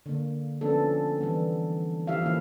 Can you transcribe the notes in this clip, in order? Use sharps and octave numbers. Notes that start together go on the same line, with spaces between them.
D3 A#3
F3 B3 C#4 D4 A4
E3 G3 B3
F3 E4 G4 E5 F5
E3 A#3 E4